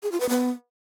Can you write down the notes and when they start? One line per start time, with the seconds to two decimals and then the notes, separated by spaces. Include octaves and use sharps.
0.03 G#4
0.12 F4
0.20 B4
0.29 B3